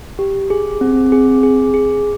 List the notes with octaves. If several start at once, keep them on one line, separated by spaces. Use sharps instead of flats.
G4
G#4
C4
G#4
G#4
G#4